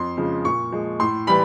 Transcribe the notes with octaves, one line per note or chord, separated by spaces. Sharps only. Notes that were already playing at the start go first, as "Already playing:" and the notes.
Already playing: F2 C6
C#3 F3 G#3
A#2 C#6
F3 G#3
A2 C6
E3 G3 B5